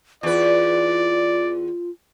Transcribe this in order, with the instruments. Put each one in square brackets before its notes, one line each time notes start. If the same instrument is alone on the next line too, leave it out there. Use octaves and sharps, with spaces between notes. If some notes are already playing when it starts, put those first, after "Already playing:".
[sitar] E2 B4 [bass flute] F4 [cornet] D5